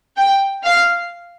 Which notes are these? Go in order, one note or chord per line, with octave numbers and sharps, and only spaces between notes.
G5
F5